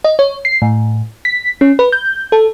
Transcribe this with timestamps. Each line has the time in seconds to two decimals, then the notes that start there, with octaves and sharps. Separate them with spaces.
0.04 D#5
0.19 C#5
0.45 C7
0.62 A2
1.25 B6
1.61 C#4
1.79 B4
1.92 G6
2.32 A4